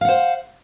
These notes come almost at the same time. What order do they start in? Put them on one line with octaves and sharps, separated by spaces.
F5 F#5 C5